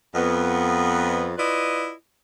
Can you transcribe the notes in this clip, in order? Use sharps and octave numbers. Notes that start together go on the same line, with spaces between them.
F2 B3
E4 F4 B4 D5 D#5